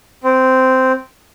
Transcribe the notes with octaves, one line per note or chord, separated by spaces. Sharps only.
C4